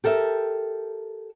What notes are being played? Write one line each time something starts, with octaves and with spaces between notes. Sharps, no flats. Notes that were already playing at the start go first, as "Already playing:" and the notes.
G4 A4 A#4 E5